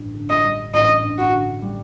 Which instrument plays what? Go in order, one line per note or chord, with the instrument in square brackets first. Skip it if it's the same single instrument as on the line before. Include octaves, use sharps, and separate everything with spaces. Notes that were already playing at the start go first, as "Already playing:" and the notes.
Already playing: [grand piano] A1 G2 D3 G3
D3
[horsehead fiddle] D#5
[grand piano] G3
[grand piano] A1 [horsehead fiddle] D#5
[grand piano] G2
[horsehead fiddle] F#4
[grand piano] D3
G3